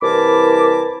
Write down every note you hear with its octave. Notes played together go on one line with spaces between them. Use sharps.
C2 E3 A#4 A5 B5 D6